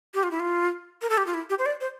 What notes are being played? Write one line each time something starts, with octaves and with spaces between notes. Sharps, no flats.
G4
F4
E4
F4
A#4
A4
G4
F4
E4
G4
C5
D5
C5